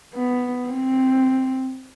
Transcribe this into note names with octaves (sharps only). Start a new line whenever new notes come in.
B3
C4